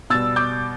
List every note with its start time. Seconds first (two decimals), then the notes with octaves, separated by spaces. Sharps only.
0.10 B2 G3 E6 A6
0.36 D6 G6